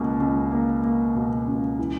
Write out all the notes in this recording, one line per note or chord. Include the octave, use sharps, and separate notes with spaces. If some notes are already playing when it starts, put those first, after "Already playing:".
Already playing: C#2 B2 A#3
C#2
A#3
A#3
B2
C#2
E3